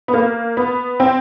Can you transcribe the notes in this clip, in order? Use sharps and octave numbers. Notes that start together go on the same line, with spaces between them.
B3
A#3
B3
C4